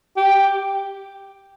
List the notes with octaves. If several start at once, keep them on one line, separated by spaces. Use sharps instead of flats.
G4